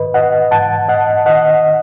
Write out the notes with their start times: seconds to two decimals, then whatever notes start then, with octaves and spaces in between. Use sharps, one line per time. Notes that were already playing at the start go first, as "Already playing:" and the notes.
Already playing: G#2 D#3 B4 D#5
0.14 D#5 F#5
0.51 G#2 E3 F#5 A5
0.88 D#5 F#5
1.26 D#3 D#5 F#5